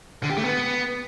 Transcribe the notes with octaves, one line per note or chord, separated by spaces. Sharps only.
D3
G4
A3
B3